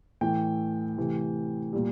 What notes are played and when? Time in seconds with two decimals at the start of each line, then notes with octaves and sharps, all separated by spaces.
0.21 A2 E3 A3 G5
0.98 C3 E3 A3
1.73 A#2 G3